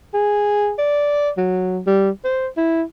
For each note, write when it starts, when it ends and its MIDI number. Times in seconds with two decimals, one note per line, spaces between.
0.14 0.73 68
0.78 1.30 74
1.37 1.80 54
1.86 2.10 55
2.24 2.48 72
2.57 2.82 64